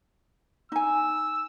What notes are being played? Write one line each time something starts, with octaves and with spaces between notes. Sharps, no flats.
D#4 G#5 E6